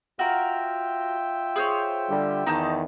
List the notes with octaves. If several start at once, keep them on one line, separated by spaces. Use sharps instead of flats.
F4 F#4 A#4 E5 G5
G#4 C5 C#5
D3 G3
E2 D#3 D#4 A5 G6